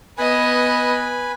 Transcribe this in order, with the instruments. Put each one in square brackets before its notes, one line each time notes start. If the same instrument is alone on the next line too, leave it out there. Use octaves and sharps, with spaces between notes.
[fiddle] B3 D#5 [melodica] B4 G#5 B5